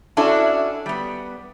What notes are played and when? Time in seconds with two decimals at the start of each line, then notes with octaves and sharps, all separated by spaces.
0.17 C#4 D4 E4 F#4 A4
0.86 G3 B3